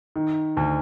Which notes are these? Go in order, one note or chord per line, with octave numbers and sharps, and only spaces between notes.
D#3
D2